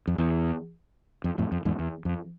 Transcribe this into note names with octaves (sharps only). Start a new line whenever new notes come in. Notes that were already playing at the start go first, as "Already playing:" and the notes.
F2
E2
F2
F2 A2
F2
E2 G#2
E2
F2